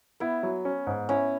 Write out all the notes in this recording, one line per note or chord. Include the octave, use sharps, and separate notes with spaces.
B3 E4
F#3
C#4
G#2
C#4 E4